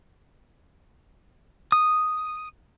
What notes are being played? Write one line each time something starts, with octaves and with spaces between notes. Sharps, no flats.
D#6